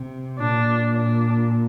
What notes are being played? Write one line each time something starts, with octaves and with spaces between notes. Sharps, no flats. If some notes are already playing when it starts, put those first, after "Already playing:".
Already playing: C3
A#2 D4
D4